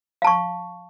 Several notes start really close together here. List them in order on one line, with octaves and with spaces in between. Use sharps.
F5 A5 C#6